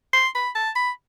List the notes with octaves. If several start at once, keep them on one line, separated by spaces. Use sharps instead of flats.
C6
B5
A5
B5